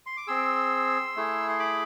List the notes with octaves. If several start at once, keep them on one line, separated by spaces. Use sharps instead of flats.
C6
D6
C4 G#4 C6 E6
A3 E4 G#4
C6
B5 D6